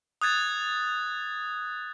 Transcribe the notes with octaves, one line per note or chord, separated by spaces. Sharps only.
D#6 F#6 G#6 A6